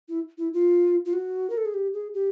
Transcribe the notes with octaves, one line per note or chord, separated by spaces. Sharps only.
E4
E4
F4
F4
F#4
A#4
A4
G#4
G4
G#4
G4